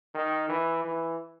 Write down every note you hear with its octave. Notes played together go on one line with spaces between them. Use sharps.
D#3
E3
E3